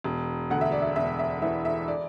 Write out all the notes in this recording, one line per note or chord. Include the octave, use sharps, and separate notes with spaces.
E1
D2 F#5
E5
D5
E5
E1 E5
E5
E3 E5
E5
D5